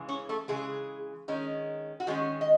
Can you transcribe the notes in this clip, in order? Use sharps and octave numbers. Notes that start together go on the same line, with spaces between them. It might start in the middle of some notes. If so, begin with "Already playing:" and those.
Already playing: C#3 E3 G#3
C#4 C#5
A3 A4
C#3 E3 G#3 G#4
D#3 G#3 C#4
F#4
D#3 G#3 C#4 G#4
D#5